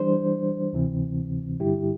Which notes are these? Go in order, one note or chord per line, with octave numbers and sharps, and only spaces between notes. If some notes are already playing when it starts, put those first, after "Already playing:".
Already playing: E3 G3 D4 C5
D2 C3 E3 C4
G2 D3 G3 E4 G4